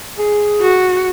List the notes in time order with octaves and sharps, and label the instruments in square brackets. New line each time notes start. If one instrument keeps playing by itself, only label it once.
[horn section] G#4
[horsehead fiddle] F#4